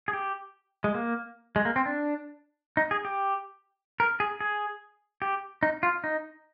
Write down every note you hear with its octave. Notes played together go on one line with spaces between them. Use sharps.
G#4
G4
G#3
A#3
G#3
A#3
C4
D4
D#4
G#4
G4
A#4
G#4
G#4
G4
D#4
F4
D#4